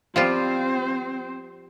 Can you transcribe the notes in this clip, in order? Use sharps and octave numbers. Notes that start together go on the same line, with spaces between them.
F3 G3 C4 F4 C5